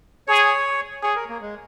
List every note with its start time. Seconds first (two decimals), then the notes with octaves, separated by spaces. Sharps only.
0.28 G#4 C#5
1.03 G#4 C#5
1.16 A#4
1.29 A#3
1.41 G#3